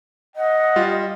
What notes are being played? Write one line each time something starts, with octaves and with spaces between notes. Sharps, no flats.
D#5 F#5
G3 F4